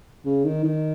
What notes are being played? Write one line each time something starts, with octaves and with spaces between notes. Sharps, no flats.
C#3
D#3
D#3